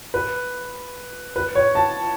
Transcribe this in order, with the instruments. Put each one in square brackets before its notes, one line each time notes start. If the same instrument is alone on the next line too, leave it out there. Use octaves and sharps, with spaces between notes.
[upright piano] B4
B4
C#5
A5